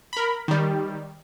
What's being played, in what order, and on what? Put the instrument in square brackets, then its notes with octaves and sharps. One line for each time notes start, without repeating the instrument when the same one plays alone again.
[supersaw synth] A#4 B5
D#3 G3